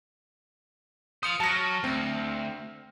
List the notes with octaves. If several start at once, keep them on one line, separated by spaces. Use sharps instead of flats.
C5 F5 D#6 C#7
F#3 A5 F6 A#6
D2 C4